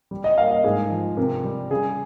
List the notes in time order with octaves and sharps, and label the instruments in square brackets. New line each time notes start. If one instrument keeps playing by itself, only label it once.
[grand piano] G3
D#5
A#3 F5
D#5
G#2 G#4
F3
C3 A#4
G3
C#3 G#4